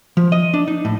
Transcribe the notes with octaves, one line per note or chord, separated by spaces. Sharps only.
F3
D#5
D4
D#4
A2